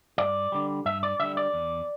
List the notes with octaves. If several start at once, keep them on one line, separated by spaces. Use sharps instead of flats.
G2 D5
D3 G3
G2 E5
D5
D3 G3 E5
D5
E2